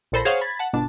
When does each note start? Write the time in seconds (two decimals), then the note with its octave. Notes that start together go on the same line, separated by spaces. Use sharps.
0.12 A#1 A#2 A4 C5 B5 A#6
0.25 G#4 C5 C#5 F5 F#5 C#6
0.41 B5 G#6 A6 B6
0.59 F#5 A5
0.73 G1 B2 D4 A5